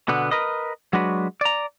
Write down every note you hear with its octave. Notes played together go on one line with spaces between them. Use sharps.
B2 D3 B3
A#4 B4 D#5
F#3 G#3 D4 F#4 B4
D5 A#5